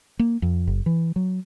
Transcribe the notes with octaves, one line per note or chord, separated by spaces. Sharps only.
A#3
F2
F#1
E3
F#3